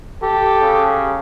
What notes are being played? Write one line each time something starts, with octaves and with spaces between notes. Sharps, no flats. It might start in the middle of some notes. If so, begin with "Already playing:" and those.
G4 A4
C#3